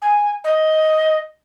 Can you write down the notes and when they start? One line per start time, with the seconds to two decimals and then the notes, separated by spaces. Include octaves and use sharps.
0.02 G#5
0.44 D#5